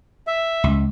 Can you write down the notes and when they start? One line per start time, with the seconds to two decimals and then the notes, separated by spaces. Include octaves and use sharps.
0.27 E5
0.64 C#2